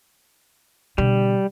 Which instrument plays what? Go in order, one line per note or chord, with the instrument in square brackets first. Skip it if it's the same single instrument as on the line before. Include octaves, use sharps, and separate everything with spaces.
[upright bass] B2 D3 [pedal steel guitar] G3